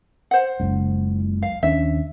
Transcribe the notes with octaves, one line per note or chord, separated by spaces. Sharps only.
C5 F#5
F#1 C#2
F5
D#2 C#4 D4 E5